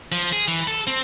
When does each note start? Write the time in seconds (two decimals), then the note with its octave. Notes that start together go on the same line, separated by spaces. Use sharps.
0.12 F3
0.33 G#4
0.48 E3
0.68 A4
0.87 C4